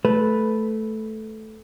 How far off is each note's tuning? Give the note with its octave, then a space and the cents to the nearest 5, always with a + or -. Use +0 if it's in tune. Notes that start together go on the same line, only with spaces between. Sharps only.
A3 -10 B4 +0